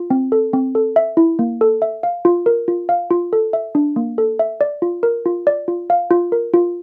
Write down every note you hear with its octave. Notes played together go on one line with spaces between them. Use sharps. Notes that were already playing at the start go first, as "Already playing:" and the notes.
Already playing: F4
C4
A4
C4
A4
E5
E4
A#3
A4
E5
F5
F4
A#4
F4
F5
F4
A4
E5
D4
A#3
A4
E5
D5
F4
A#4
F4
D5
F4
F5
F4
A#4
F4